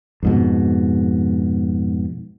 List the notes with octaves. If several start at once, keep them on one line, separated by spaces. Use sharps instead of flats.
F2 G#2 B2